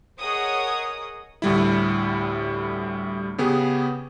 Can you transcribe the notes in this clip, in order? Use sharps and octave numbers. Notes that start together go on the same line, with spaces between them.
G#4 A#4 C#5 D#5 F#5 D#6
D2 A2 G3 E4
C#3 B3 G4 G#4